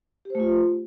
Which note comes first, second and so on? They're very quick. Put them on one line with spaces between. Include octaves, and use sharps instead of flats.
G4 C5 A3 F4